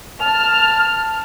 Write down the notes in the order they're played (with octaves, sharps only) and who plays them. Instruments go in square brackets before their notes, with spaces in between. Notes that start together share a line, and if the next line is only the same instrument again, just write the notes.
[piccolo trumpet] A5 [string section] F6